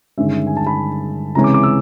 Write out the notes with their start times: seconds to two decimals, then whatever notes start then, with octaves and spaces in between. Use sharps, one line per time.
0.18 G1 G2 D#3 G#3 C#4 E5
0.33 E5
0.47 G#5
0.57 A5
0.67 B5
1.35 C#2 C3 E3 G#3 C#4 A#5
1.44 D6
1.54 D6
1.63 E6